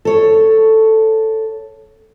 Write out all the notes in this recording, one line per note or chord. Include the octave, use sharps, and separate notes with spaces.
A4 C#5